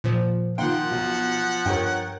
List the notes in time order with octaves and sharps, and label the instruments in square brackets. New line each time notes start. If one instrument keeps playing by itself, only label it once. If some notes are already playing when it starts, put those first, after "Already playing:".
[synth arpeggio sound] A#2 F3
[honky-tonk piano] A#2 D#3 A#3 [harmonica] F3 F#5 [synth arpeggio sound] G5 C6
[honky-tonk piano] B1
[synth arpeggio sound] G2 [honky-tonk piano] A#4 C#5 G5